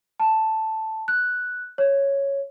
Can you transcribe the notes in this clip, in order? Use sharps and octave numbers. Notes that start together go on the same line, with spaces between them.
A5
F#6
C#5